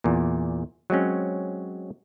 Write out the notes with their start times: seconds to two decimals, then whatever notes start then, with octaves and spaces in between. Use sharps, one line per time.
0.04 E2 A#2
0.90 F#3 G#3 C4 C#4